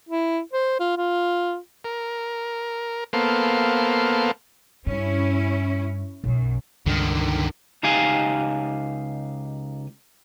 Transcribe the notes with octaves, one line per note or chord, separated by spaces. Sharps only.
E4
C5
F4
F4
A#4
A#3 B3 A4 C5 F5
G2 C#4 E4
B1 F#2 F#3
C#2 G2 D3 D#3
C#2 D#4 G4 F5 G#5